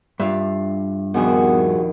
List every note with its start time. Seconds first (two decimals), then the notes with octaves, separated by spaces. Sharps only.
0.20 G2 D4 F4 E5
1.14 A#1 D#2 C3 B3 F#4 G#4